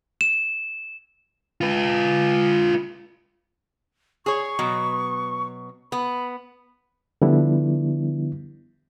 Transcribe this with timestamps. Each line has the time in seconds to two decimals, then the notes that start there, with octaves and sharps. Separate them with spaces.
0.21 E7
1.61 F4 B4
4.26 G#4 C#5 C#6
4.59 B2 F#3 B3
5.92 B3 B5
7.22 D3 F3 G3 B3 D4 E4